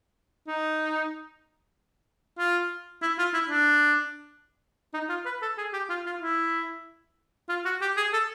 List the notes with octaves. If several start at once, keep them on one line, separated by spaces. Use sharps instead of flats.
D#4
F4
E4
F4
E4
D4
D#4
F4
B4
A4
G#4
G4
F4
F4
E4
F4
F#4
G4
G#4
A4